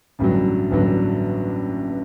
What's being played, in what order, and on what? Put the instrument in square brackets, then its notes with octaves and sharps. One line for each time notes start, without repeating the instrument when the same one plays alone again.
[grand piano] A1 G2 D3 F#3
A1 G2 D3 F#3